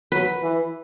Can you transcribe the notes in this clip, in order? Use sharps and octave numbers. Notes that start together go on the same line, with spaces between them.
F#3 B4
E3